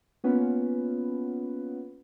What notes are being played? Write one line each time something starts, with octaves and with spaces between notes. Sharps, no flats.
A#3 B3 C#4 F4 B4